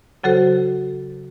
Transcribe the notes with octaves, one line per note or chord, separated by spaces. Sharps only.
C#3 F#3 F#4 A4 C5